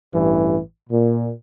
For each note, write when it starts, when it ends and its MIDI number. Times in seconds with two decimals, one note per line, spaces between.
0.13 0.59 33
0.13 0.59 43
0.13 0.59 52
0.90 1.32 46